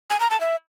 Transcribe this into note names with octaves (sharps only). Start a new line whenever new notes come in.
G#5
A#5
A5
E5